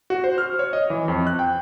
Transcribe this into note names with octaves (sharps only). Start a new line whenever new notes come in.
F#4
C5
F6
C#5
D#5
E3
F2
F#6
G5